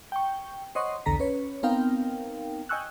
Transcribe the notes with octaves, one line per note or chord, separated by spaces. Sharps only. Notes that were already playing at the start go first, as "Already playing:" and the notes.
G5 C#6
C5 C#5 D#5 F#5 C6 C#6
B1 E2 D3 A4 A#5 B6
C#4 B4 C#5
B3 C4 D#4 A#4 F5 G5
D#5 G5 G#5 C#6 E6 F#6